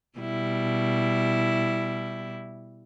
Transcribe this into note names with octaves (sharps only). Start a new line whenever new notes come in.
B2 G3 E4